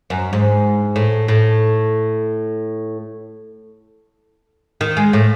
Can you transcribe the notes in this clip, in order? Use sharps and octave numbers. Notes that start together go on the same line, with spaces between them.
F#2
G#2
A2
A2
D#3
G#3
A2